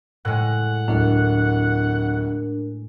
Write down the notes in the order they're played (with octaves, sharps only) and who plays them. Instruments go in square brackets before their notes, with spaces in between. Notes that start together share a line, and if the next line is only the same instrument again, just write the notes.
[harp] A2 G#3 [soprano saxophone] F#5
[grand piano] D1 [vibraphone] D4 A#4